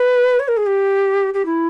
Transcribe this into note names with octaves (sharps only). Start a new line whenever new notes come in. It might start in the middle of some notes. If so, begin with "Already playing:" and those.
Already playing: B4
C#5
A#4
G#4
G4
G4
E4